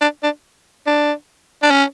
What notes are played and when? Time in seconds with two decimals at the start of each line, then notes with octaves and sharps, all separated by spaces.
0.01 D4
0.23 D4
0.87 D4
1.63 D4
1.71 C#4